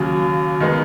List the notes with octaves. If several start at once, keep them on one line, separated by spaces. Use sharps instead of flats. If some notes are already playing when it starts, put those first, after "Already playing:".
Already playing: D#2 C#3 F#3
D#3 G#3 B3